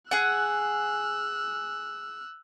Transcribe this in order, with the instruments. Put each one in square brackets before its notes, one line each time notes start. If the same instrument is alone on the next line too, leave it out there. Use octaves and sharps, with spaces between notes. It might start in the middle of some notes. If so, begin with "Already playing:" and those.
[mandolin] G#4 F#5 [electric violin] E6 F#6